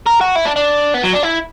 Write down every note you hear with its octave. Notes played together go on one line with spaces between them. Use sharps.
A#4
F#4
E4
D4
D4
B3
F#3
D4
E4